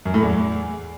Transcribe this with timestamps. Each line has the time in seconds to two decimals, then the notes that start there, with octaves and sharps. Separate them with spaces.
0.05 F#2
0.14 A2
0.23 E2